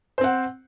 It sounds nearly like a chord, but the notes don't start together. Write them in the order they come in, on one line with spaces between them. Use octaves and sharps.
C5 C4 F#5